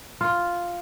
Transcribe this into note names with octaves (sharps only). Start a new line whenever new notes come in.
F4